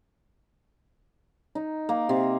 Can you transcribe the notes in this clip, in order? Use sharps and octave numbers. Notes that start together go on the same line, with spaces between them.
D#4
A#3
C3